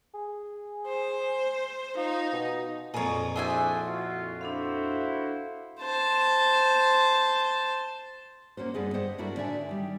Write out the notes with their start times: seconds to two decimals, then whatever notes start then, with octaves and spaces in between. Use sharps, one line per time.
0.14 G#4
0.87 C5
1.97 D#4 F4
2.33 B2
2.94 F2 A#2 G#4 C#5 A#5
3.36 D4 E4 F#4 G#4 C5 E5 G#5 C6
3.84 F4 F#4
4.41 D4 E4 F#4 A4 C5 F5
5.80 C5 A5
8.57 A#3 C#4 F#4 C5
8.74 G2 D3 B3 G#4 D#5
8.94 G2 C5 D#5 F#5
9.18 D4 E4 F#4 A4 A#4
9.36 A2 D3 D4 D#4 E5 G#5
9.69 D#3 G3